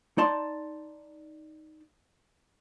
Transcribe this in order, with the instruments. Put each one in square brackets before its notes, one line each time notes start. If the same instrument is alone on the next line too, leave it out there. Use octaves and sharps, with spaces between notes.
[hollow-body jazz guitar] D#4 D5 A5 C6